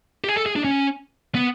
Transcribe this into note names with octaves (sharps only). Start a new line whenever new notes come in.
G4
G#4
A4
G#4
D4
C#4
B3